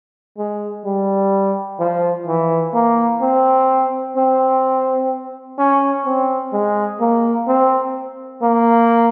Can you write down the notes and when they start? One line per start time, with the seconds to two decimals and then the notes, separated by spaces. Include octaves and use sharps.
0.38 G#3
0.85 G3
1.80 F3
2.27 E3
2.75 A#3
3.22 C4
4.17 C4
5.59 C#4
6.06 C4
6.53 G#3
7.00 A#3
7.48 C4
8.42 A#3